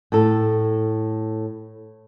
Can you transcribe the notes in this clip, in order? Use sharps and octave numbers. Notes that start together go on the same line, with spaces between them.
A2 A4